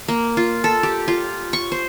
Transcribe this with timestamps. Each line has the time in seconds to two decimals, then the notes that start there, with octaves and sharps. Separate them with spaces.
0.08 A#3
0.37 F4
0.64 A4
0.83 G4
1.08 F4
1.53 C#6
1.72 C5